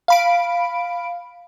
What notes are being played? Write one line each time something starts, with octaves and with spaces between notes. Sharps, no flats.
F5 B5 D7